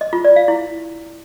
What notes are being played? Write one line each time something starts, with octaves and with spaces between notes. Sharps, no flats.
D#5
F4
D5
F5
E4